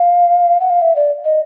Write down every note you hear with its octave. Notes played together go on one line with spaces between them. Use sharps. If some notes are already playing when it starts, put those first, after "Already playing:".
Already playing: F5
F#5
F5
E5
D5
D#5